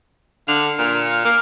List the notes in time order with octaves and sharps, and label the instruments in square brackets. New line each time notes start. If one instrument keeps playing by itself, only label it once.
[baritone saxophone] D3 [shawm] F5 [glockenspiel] F7
[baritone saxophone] A#2
[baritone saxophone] A#3 [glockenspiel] F6